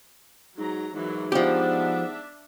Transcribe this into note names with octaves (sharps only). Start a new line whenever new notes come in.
G#2 F#3 A#5
G#2 E3 F#3 A#4
F3 B3 D4 G4 E5